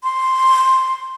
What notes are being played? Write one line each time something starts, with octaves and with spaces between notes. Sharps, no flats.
C6